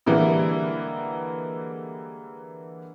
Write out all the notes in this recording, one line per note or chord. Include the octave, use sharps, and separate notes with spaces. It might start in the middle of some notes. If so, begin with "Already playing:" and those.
D3 E3 G3 G#3 A#3 E4